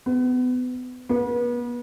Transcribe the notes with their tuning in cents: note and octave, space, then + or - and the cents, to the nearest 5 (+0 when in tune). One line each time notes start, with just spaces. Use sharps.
B3 +30
B3 -35